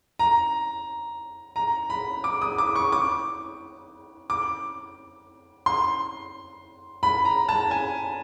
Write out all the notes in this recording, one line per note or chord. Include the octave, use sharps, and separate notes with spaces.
A#5
A#5
B5
D6
D#6
D6
C#6
D6
D6
C6
B5
A#5
A5
G#5